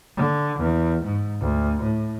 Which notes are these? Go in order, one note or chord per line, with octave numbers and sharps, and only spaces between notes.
D3
E2
G#2
D2
A2